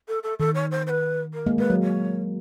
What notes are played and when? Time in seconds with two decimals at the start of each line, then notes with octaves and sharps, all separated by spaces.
0.08 A4
0.23 A4
0.39 D#3 A4
0.55 C#5
0.71 C5
0.87 C5
0.90 B4
1.34 A#4
1.46 G#3 A#3
1.58 G#3 B4
1.70 F#3
1.82 C#5